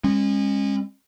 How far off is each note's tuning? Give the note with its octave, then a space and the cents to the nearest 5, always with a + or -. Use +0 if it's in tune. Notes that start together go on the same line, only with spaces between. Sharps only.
G#3 -30 C#4 -30